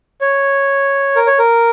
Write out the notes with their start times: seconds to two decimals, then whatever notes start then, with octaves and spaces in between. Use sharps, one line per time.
0.21 C#5
1.16 A#4
1.27 C#5
1.39 A#4